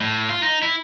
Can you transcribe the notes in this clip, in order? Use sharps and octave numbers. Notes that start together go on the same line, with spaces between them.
A2
F4
D#4
E4